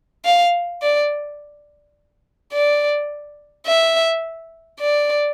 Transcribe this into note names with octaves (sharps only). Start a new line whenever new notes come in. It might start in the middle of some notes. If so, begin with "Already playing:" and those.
F5
D5
D5
E5
D5